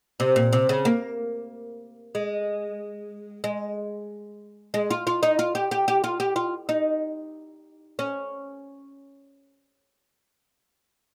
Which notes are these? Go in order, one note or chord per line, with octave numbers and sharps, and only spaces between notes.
C3
A#2
C3
C#3
A#3
G#3
G#3
G#3
F4
F4
D#4
F4
G4
G4
G4
F4
G4
F4
D#4
C#4